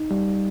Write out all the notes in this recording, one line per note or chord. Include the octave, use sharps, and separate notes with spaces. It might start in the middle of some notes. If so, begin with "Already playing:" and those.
Already playing: D#4
G3